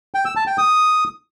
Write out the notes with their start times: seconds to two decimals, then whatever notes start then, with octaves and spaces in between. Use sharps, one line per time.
0.14 G5
0.25 E6
0.36 A5
0.47 G5
0.58 D#6